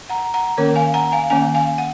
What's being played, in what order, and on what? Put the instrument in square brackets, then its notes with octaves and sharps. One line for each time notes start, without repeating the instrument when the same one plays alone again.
[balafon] F#5 A#5
F#5 A#5
D#3 A#3 C#4 A#4 C#5
F5 G#5
F#5 A#5
F5 G#5
D#3 A#3 C#4 F5 G#5
F5 G#5
F#5